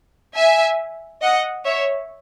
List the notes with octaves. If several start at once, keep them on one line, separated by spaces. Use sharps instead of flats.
E5 G#5
D#5 F#5
C#5 E5